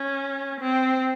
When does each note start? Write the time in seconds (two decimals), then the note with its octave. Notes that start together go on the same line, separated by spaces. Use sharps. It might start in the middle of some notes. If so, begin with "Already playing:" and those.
Already playing: C#4
0.60 C4